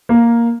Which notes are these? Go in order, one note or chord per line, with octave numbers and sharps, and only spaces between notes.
A#3